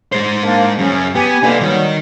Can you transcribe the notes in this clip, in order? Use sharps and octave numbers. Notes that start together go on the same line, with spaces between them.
G#3 C5
A#3 D4
F#2 C#3 C#4
B3 G4 G#5
D3 G#3 A#3 D#4 B4
D#3 F#3 G3